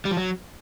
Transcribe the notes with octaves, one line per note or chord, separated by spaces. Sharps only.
G3
F3
F#3